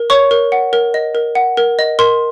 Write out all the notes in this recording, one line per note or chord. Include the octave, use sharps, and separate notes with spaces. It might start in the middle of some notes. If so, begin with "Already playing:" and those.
Already playing: A#4
C#5 C#6
A#4
F#5
A#4
D#5
A#4
F#5
A#4
D#5
A#4 C6